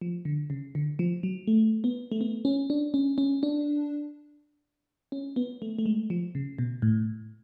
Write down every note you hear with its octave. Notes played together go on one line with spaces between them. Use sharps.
F3
D3
C#3
D3
F3
F#3
A3
B3
A3
B3
C#4
D4
C#4
C#4
D4
C#4
B3
A3
A3
G#3
F3
C#3
B2
A2